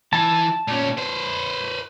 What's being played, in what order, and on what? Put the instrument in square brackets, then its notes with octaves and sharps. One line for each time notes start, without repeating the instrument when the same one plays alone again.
[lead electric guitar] E3 [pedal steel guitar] A5
[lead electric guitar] A#2 C#4
B4 C5